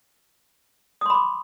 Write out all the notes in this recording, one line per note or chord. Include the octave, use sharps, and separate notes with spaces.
B5 C6 D6 D#6